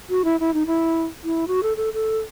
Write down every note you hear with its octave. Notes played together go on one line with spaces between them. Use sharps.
F#4
E4
E4
D#4
E4
E4
F#4
A4
A4
A4